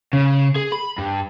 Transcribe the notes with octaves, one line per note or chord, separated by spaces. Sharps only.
C#3
G#4
B5
G2